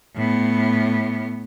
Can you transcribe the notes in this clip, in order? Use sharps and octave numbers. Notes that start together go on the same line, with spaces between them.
A2 B3